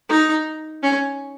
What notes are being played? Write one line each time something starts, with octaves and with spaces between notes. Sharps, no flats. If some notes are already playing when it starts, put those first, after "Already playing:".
D#4
C#4